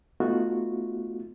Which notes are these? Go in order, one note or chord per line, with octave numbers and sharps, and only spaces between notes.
A3 B3 D#4 F4 F#4